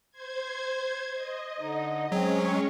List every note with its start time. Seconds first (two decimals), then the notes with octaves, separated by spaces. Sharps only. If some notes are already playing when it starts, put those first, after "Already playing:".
0.11 C5 G#6
1.14 D#5
1.60 D3 D#4
2.12 F#3 G#3 C4 C#4 G#4 C#5